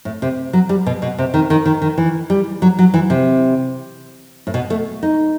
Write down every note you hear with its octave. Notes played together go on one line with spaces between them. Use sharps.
A2
C3
F#3
G3
B2
B2
C3
D#3
D#3
D#3
D#3
E3
G3
F#3
F#3
E3
C3
A2
B2
A3
D#4